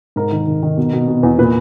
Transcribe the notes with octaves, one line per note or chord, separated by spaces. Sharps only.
G#2 A#4
D#3
D#3
D#3
B2
B2
B2
E2
A#2 B4